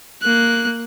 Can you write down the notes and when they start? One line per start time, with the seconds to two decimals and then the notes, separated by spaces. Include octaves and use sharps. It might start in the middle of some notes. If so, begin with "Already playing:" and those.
0.23 A#3 F#6